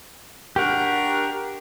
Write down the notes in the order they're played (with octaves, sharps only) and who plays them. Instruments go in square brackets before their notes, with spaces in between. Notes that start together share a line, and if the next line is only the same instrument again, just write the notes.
[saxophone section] D4 F#4 A#4 [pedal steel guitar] G4 F#5